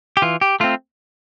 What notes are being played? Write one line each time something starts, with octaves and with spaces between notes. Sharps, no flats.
G4
E3 F4
G4
A3 C4 F4